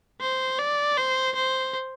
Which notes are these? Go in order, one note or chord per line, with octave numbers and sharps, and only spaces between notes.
C5
D5
C5
C5